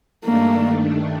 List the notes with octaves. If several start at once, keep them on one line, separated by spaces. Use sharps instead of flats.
G2 D#3 A3 A#3 D4